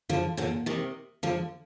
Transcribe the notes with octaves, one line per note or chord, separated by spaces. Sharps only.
D3 F3
A#2 D3
C3 D#3
D3 F3